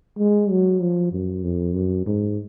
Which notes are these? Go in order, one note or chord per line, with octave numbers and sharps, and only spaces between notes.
G#3
F#3
F3
F#2
F2
F#2
G#2